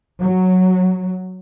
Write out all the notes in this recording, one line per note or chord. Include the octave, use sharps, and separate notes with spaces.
F#3